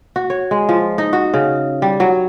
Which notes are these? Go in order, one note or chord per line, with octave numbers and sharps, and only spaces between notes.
F#4
C#5
G#3
F3
D#4
F#4
C#3
G3
F#3